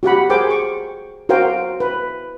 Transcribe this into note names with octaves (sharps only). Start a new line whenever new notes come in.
F#4 G4 F#5 B5
G#4 A#4 C5 G5 D6
C#6
F#4 A#4 C5 F5 G5
B4